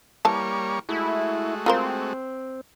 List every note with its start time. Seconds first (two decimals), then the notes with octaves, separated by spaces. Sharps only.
0.25 E3 G3 A#3 C#5 A5
0.89 G#3 A3 E4 F#4
1.66 C4 F4 A#4 C5